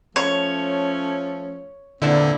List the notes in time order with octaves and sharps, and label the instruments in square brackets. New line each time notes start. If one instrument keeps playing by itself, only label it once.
[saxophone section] F3 A3 C#4 [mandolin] C#5
[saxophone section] E2 B3 C4 [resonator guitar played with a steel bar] A#2 D4 E4 [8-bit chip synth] D3